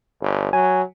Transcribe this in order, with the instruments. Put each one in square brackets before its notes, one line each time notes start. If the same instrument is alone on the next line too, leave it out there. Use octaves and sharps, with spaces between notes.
[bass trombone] G1
[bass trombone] F#3 [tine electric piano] G#5